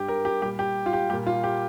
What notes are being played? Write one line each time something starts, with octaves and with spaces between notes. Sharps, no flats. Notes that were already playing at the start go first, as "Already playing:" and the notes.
Already playing: G2 G3 G4
A#4
G4
A#2 G3 G4
G4
F4
G4
A#2 G3 G4
F4
G4